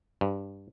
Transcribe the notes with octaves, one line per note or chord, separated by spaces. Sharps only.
G2